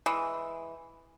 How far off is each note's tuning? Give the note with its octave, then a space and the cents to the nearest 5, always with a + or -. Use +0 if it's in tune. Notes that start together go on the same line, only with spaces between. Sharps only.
E3 +0 G#3 +0